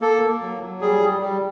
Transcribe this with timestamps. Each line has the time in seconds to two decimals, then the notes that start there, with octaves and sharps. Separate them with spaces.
0.01 A#3 A4
0.22 A#3
0.42 F#3
0.61 F#3
0.81 G3 G#4
1.02 G3
1.21 G3